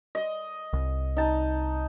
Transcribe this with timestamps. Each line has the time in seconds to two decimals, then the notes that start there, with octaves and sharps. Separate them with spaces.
0.15 D#5
0.73 C2
1.17 D#4 A5